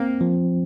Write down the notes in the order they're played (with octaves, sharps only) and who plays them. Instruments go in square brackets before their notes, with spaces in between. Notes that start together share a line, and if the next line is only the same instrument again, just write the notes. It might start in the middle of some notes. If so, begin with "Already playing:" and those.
Already playing: [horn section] A#3 [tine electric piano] C4
[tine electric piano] F3